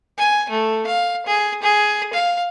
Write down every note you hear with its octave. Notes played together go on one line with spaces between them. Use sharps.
G#5
A3
F5
G#4
G#4
F5